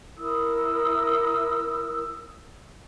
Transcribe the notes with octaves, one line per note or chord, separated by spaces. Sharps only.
E4 A#4 D#6 E6